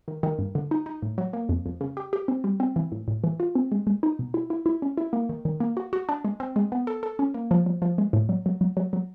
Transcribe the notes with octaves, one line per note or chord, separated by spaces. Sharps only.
D#3
D#3
G2
D3
D#4
D#4
A2
F#3
A#3
F2
F2
C#3
G4
G4
C4
G3
C4
E3
A2
A2
E3
F4
C4
G#3
G#3
D#4
B2
E4
E4
E4
C#4
E4
A#3
D#3
D#3
A#3
F#4
F#4
D4
G#3
C4
G#3
B3
A4
A4
C#4
A#3
F3
F3
F3
G#3
A2
F#3
F#3
F#3
F#3
F#3